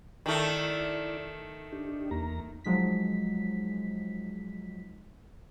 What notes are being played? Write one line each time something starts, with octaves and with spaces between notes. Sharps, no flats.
D#3 A3 E4 D5
D4 D#4 G4
E2 A#3 A#5
F3 F#3 G#3 D#4 B6